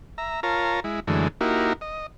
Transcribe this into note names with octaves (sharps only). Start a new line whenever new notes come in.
E5 A#5
F4 A#4 C#5 A5 A#5
G#3 E4
F#2 D3 E3 G#3 A3
A#3 D#4 E4 F#4 G4 A#4
D#5